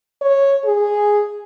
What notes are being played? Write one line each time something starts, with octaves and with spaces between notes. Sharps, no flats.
C#5
G#4